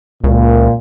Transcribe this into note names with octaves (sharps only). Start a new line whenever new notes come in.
C#2 A#2